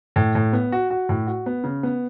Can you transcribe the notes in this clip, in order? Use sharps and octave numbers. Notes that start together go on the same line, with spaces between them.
A2
A2
B3
F#4
F#4
A2
F#4
B3
C#3
B3